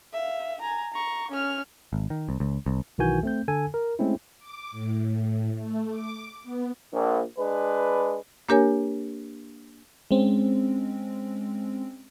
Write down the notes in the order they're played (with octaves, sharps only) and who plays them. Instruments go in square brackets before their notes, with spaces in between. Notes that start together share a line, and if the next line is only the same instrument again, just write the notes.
[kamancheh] E5 F5
G#5 A#5
A#5 C#6
C#4 F6
[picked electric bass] G#1
D#3
C2
C#2
C2
[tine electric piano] B1 D#3 E3 F#4 G#5 G6
A3 C4 G6
D3 A4 G#5
A#4
G#3 A3 C4 C#4 E4
[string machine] D6
A2
A3
D6
B3
[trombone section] A#1
G#3 D4 B4
[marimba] A#3 D4 G4 A#4 C#5 G#5
[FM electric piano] G#3 C4 C#4